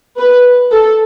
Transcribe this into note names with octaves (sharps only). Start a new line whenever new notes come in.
B4
A4